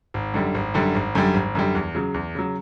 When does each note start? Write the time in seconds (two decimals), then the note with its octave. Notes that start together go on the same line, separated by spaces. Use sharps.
0.14 G#1
0.34 F#2 D3 G3
0.55 G#1
0.74 F#2 D3 G3
0.95 G#1
1.15 F#2 D3 G3
1.34 G#1
1.55 F#2 D3 G3
1.75 E2
1.95 C#3 F#3
2.14 E2
2.35 C#3 F#3